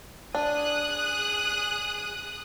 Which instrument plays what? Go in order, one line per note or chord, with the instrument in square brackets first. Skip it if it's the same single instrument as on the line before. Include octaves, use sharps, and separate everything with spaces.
[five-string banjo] D4 [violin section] G#4 D#6 F#6